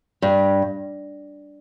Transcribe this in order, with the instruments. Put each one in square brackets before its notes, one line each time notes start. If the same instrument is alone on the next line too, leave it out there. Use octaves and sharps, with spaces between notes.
[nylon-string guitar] G2